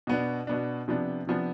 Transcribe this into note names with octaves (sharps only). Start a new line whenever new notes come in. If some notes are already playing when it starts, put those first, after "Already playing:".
B2 B3 D4
B2 B3 D4
C3 F3 B3 D4
C3 F3 B3 D4